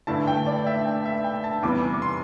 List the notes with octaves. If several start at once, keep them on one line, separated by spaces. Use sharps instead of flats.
G2 D3 A3 E4 A5
G5
D5
E5
G5
E5
G5
A5
E2 C3 E3 G3 E4 D6
D6
C6